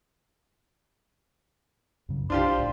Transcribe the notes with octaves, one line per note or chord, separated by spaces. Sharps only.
F#2 C#3 F#3
B1 D4 F4 G4 C5
A1 A2